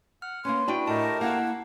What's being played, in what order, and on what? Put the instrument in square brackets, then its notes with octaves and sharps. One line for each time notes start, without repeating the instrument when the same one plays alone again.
[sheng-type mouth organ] F#5 [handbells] F6
[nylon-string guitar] A#3 C#4 [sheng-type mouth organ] B4 [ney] C6
[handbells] D4 E4 F#4 [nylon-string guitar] D5 G5
[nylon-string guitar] A2 [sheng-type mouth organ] A3 G4 A#4 [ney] D#5 [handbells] A5
[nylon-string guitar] A#3 E4 F5 [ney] F#5